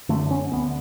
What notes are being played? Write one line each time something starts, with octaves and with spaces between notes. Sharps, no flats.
F#2 D3 A3
C#4
D2 D3 B3